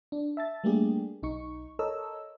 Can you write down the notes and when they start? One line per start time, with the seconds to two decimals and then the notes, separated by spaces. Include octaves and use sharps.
0.12 D4
0.37 E5 A5 A6
0.64 G3 A3 A#3 D4 G4 G#4
1.23 B1 D#4 C#6
1.79 A4 A#4 C#5 D#5 E6